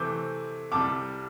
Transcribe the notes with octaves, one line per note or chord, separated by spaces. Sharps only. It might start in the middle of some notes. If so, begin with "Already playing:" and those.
Already playing: C3 E3 A3 C4 D6 G6
C2 C3 G3 A5 D6